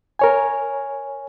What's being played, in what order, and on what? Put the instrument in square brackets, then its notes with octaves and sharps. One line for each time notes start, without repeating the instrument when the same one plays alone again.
[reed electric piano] A#4 C#5 G#5